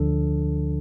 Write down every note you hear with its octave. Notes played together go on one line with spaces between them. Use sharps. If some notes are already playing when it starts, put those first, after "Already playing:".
Already playing: D2 D3 F3 D4 A4